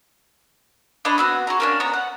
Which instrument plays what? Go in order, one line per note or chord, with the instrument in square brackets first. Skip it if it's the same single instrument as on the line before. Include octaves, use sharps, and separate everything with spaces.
[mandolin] D4 C#5 D#5 B5
B3 C4 F#4
F#4 G#4 A#5
A#3 C#4 D4
B3 C#5 A#5
F#5